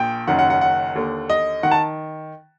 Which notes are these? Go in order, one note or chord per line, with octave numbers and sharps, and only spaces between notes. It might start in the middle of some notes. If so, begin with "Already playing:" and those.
Already playing: A#1 A#2 G5
F#1 F#2 D#3 F#5
F#5
F#5
F#5
D#2 D3
D#5
D#3 F#5
A5